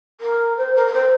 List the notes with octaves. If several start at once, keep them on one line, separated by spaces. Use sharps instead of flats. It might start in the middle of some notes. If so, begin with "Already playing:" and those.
A#4
C5
A#4
A#4
C5